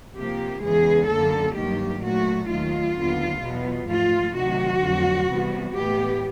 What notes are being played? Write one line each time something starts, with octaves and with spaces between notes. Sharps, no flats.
C3 F3 A#3 G4
E2 C#3 E3 G#3 G#4
F#2 D3 F#3 A#3 A4
G2 D#3 F#3 A#3 G4
A#2 F#3 A3 F#4
D#2 D#3 F#3 A3 F4
D#2 D3 F#3 B3
E2 B2 F#3 B3
G#2 F3 A3 F4
D2 C3 D#3 F#3 F#4
F2 D3 F#3 A3
C3 E3 G3 B3
A2 E3 G#3 B3 G4